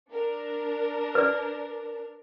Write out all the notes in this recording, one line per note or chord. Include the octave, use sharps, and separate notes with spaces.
D4 A#4
B4 D5